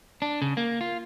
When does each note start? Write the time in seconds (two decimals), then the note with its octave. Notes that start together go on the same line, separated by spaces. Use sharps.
0.22 D4
0.42 C#3
0.57 A#3
0.81 F4